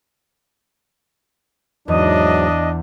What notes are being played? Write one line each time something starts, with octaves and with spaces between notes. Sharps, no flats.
E2 G#2 F#3 D4 D#5